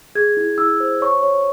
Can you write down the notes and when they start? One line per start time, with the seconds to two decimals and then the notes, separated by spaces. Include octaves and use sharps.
0.15 G#4 G#6
0.37 E4
0.58 E4 E6
0.80 C5
1.01 C#5 C#6
1.23 C#5